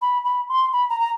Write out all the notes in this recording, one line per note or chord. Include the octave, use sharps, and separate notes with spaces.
B5
B5
C6
B5
A#5
A#5